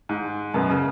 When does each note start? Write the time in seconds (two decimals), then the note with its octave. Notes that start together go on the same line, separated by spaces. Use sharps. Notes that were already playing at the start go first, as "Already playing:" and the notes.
0.09 G#2
0.54 F#2 B2
0.70 C#3